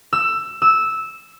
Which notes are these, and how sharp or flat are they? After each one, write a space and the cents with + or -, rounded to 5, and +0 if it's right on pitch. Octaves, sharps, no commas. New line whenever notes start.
E6 +15
E6 -10